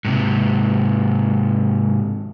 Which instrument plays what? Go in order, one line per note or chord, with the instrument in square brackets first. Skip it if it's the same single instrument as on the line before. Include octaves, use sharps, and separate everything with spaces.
[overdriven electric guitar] G#2 C3